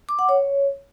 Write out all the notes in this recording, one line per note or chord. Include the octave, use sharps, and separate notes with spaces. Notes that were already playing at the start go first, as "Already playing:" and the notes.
D6
F#5
C#5